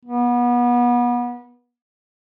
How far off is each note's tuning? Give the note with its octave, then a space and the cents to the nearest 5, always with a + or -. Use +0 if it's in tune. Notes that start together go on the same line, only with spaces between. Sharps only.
B3 -30